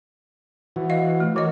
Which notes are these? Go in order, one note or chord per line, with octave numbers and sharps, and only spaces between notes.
E3 F#4
D#5 F5
A3
E3 F#4 A#4 C#5 D#5